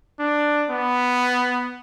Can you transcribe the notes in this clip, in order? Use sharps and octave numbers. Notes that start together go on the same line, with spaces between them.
D4
B3